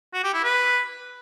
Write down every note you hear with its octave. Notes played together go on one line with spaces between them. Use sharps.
F#4
G4
E4
B4